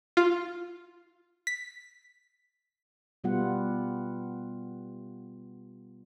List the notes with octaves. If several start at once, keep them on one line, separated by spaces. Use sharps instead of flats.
F4
B6
B2 G3 B3 F4 F#5